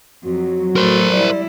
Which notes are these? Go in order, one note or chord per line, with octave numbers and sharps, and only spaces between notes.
F2 F#3 F#4
A2 A4 A#4 C5
G3 E4 D5